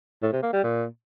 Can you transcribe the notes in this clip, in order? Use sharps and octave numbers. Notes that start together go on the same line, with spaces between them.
A2
C3
A#3
G3
A#2